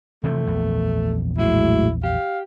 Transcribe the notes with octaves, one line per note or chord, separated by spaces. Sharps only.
C3 E3 F3 A3
A#1 E2
A2 F#3 G#3 E4
G4 F5